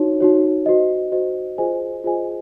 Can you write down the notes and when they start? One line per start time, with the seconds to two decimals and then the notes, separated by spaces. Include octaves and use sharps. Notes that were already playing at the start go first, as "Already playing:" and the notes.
Already playing: D#4 F#4 C#5
0.20 D#4 F#4 C#5
0.66 F#4 C5 D#5
1.12 F#4 C5 D#5
1.58 F4 G#4 C5 D#5 G#5
2.04 F4 G#4 C5 D#5 G#5